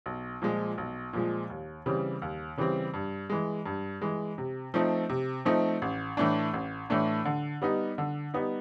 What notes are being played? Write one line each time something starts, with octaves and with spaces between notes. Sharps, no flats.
B1
A#2 F3 G#3
B1
A#2 F3 G#3
D#2
C#3 E3 G3 C4
D#2
C#3 E3 G3 C4
G2
E3 G#3
G2
E3 G#3
C3
F3 A3 C4 D#4
C3
F3 A3 C4 D#4
A1
A2 E3 A3 D4
A1
A2 E3 A3 D4
D3
G3 B3 D#4
D3
G3 B3 D#4